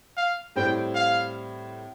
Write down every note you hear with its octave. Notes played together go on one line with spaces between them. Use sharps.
F5
A2 G3 C4 G5
F5